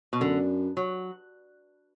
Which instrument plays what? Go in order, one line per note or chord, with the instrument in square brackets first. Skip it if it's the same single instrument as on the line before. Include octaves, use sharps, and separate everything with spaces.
[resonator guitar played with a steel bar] B2
[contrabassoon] F#2 [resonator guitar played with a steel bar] D3
[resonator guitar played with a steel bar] F#3